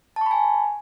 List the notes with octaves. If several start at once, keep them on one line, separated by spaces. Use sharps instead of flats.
G#5 A5 B5 C#6